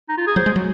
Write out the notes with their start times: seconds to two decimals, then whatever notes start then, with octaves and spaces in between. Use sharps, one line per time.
0.09 D#4
0.17 F4
0.27 G#4
0.36 F#3 C5
0.46 G#3
0.56 F#3